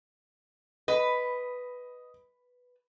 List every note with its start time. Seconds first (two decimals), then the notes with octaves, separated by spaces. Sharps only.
0.88 B4 D#5